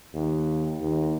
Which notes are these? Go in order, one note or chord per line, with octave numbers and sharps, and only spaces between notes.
D#2
D#2